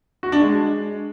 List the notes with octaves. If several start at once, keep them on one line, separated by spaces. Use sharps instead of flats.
F#4
D4
G#3